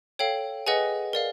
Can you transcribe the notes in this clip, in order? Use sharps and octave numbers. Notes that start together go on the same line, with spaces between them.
A4 C#5 F5 G5
G#4 B4 D#5 F#5 G#5
A#4 D5 F5